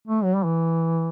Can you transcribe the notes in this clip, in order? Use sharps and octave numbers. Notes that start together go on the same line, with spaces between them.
A3
F#3
G3
E3